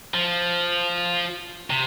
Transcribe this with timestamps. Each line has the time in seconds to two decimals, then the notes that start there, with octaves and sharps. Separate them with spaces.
0.14 F3
1.70 C3